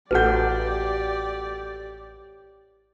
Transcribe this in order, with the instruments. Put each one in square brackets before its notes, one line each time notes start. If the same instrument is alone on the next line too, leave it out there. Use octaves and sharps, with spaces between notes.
[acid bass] A1 [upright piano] F#4 A4 G6 [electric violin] G4 D5 [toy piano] B4 F#5